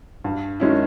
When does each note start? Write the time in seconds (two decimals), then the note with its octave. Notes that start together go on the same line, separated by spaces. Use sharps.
0.24 G2
0.60 D#3 G#3 C#4 E4